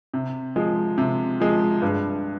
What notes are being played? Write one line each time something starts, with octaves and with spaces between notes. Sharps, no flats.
C3
F3 G#3
C3
F3 G#3
G2